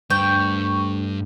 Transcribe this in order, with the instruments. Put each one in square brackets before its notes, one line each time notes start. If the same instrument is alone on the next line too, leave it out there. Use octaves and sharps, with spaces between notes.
[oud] D2 [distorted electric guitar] G2 [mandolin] G5 [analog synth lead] C#6